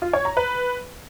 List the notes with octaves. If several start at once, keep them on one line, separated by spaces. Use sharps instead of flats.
F4
C#5
A#5
B4